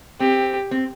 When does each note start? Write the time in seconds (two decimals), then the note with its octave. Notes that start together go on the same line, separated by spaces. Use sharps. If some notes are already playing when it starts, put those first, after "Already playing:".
0.20 C4 G4
0.71 C4